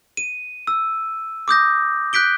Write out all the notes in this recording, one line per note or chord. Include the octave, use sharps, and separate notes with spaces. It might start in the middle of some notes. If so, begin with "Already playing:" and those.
D#7
E6
D6 D#6 G6 A#6
F#6 G6 B6 D7 G7